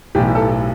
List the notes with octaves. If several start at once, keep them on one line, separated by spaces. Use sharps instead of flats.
B1 A2 E3 G4
A4